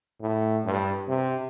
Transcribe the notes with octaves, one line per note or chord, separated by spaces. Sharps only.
A2
G2
C3